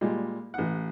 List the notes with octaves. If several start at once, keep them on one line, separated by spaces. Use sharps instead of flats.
A#2 G3 G#3
A1 F#5